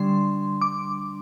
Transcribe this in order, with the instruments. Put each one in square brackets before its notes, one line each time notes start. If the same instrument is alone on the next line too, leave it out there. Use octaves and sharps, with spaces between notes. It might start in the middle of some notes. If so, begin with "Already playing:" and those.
Already playing: [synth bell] D3 G3 D4 C6
D6